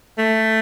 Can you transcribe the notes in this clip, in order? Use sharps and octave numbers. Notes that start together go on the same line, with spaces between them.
A3